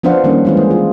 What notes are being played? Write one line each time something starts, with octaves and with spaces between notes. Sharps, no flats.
F3 B3 D4 C5 F5 F#5
D#3 G3 A#3 C#4
E3 G#3 B3 E4 C5
G#4
F4